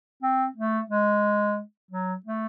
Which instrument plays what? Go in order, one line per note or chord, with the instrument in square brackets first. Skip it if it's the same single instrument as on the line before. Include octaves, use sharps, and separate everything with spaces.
[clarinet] C4
A3
G#3
F#3
A3